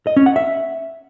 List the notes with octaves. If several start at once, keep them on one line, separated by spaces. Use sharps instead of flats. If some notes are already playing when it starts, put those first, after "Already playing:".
D#5
C#4
F#5
E5